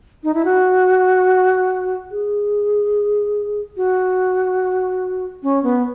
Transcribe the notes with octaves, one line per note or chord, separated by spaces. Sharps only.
D#4
E4
F#4
G#4
F#4
C#4
B3